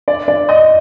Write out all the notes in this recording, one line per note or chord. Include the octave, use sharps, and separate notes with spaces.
D5
D5
D#5